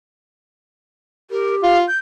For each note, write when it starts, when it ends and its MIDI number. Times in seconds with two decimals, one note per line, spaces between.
1.31 1.75 67
1.31 1.56 70
1.63 1.85 65
1.63 1.79 77
1.88 1.98 91